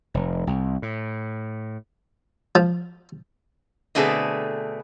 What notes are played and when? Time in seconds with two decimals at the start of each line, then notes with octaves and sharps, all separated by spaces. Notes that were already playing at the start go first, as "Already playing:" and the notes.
0.14 F1
0.47 C2
0.82 A2
2.55 F3
3.95 B2 D3 A3 C4 G#4 B4